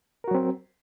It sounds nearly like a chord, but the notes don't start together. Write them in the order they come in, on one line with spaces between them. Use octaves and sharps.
A#4 F#4 F#3 C4